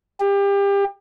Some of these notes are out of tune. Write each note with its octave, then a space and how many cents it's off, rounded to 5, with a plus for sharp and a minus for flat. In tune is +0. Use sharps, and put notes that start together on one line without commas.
G4 +30